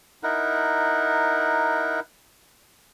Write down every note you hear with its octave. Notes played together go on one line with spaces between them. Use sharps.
D#4 E4 A#4 F#5